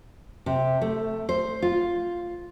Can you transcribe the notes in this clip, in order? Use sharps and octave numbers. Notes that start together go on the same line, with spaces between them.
C3
A3
C5
F4